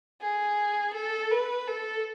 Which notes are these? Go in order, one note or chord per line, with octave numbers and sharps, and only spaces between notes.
G#4
A4
B4
A4